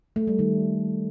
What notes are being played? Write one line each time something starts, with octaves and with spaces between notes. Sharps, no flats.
A3
G3
D#3